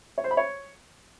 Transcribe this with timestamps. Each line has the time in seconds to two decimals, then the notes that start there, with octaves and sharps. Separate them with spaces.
0.18 C#5
0.24 C5
0.31 B5
0.37 C#5